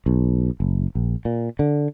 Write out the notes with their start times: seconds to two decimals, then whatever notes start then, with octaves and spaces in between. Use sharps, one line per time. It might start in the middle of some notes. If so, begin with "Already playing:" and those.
0.06 B1
0.60 F#1
0.95 A#1
1.25 A#2
1.59 D3